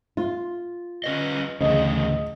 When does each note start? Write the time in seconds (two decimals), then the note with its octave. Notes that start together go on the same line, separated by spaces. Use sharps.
0.17 F4
1.04 C#4 B4 D#5
1.61 D2 A2 C#3 E3 G#4 D#5